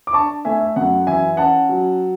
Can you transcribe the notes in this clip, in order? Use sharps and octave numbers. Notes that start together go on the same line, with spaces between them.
D6
D4 A5 C#6
A3 E5 G#5
E5
F#2 F#5
E3 E5 G#5
C#4 F#5 A5
F#3